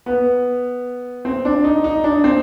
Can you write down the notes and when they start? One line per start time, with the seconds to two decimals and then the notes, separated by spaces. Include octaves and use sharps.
0.06 B3
1.25 C4
1.45 D4
1.64 D#4
1.84 D#4
2.04 D4
2.24 C4